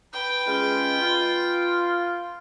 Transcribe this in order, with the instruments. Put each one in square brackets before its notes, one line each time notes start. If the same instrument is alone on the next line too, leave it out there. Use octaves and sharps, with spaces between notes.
[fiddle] B4 G5
[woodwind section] G#3 C#4 F4
F4